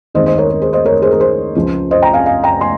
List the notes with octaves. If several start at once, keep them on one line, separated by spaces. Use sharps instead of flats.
D#2 D#3 G#3 C4 C5 D#5
C5 D#5
A#4 C#5
A#4
G#4 C5
C5 D#5
A#4 C#5
G#4 C5
A#4
G#4 C5
C#2 C#3 F3 G#3
C5 D#5
G5 A#5
F5 G#5
F5 G#5
G5 A#5
G#5 C6